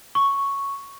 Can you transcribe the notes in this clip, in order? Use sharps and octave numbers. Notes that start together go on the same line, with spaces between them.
C#6